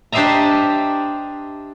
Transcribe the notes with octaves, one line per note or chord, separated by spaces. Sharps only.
D4 G4 C5 D#5 E5 A#5